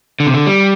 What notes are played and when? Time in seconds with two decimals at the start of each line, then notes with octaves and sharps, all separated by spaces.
0.20 D3
0.27 C3
0.34 D3
0.46 G3